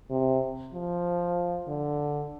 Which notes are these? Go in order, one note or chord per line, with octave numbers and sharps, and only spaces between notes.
C3
F3
D3